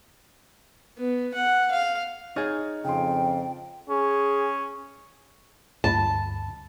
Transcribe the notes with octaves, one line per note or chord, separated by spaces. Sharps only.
B3
F#5
F5
D#4 G#4 C#5 F6 A6
F2 C#3 G5 C6
C#4 G#4
D2 G2 A5 B5